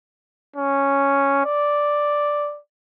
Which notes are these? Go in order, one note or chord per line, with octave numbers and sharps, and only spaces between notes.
C#4
D5